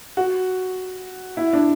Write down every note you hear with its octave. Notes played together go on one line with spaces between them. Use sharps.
F#4
E4
D4